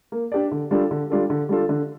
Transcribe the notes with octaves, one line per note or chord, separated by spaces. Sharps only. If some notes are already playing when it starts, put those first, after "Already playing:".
A#3
D4 G4 D5
D3
G3 D4 F4 A4
D3
G3 D4 F4 A4
D3
G3 D4 F4 A4
D3